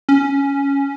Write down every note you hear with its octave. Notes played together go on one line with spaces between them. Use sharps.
C#4